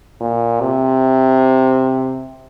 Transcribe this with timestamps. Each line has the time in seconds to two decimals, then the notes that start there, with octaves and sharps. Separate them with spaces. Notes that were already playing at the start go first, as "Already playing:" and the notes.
0.21 A#2
0.60 C3